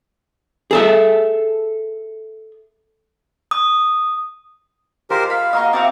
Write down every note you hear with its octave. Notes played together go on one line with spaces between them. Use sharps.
G#4 A4 E5
D#6
G#3 F4 G4 A#4 C5 C6
F5 B5
A#3 F#4 D#5 C#6
C4 E4 F#4 F5 G5 A5 D6